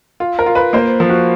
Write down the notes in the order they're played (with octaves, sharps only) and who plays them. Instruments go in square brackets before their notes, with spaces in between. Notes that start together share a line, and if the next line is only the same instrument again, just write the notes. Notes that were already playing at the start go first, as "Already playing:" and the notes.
[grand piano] F4
[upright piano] A#4
[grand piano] F4
[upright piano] B4
[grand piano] A#3 [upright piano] C5
[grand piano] F3
[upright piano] F#4